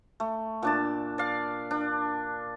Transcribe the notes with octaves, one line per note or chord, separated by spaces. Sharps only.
A3
A#2 D4 A5
D5 F5
D4